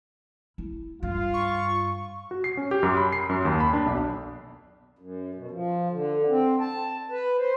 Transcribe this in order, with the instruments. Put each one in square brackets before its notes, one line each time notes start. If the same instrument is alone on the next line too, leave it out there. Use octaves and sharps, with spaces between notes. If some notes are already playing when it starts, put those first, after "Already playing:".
[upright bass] E4
[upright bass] G2 [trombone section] F4
[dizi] C#6
[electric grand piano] F#4
C7
C#4
G4
F#2
B5
C7
F#2
D#2
B5
D4
B1
[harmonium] F#2
B2
F3
D3
C4
A5
B4
C5